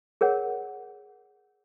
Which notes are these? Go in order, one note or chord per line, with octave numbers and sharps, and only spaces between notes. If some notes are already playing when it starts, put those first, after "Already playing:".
G#4 A#4 C#5 F#5